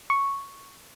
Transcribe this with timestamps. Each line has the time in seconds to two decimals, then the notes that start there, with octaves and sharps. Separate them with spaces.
0.10 C#6